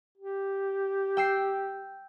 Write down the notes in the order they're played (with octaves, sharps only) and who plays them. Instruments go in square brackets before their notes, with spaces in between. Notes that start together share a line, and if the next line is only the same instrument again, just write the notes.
[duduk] G4
[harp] G5 E6 C7